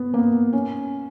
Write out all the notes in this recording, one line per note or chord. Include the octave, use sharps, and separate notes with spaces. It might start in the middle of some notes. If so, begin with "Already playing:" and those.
Already playing: B3
A#3
B3
C#4